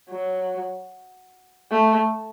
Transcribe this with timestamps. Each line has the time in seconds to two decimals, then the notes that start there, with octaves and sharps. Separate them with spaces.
0.10 F#3
1.71 A3